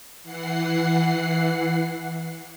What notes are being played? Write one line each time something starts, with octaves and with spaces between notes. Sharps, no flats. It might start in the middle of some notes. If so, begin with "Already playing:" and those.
E3 F#5 C7